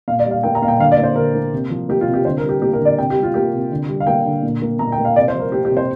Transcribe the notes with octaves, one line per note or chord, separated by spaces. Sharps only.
A#2 F5
D5
G3
F5
A#3 G5
A#5
A#2 F5
G5
D3 F5
D5
A#3
C5
D3 A#4
A#3
C3
F3
A#3 G4
F4
C3
G4
D3 C5
A#4
G3
G4
A#3 G4
A#4
D3
D5
C3 G5
G4
G3
F4
A#3 G4
C3
D3
G3
F5
A#3 G5
D3
A#2
A#3
A#2 A#5
G5
A#3
F5
C3 D5
C5
F3
A#4
A#3 G4
G4
C3
C5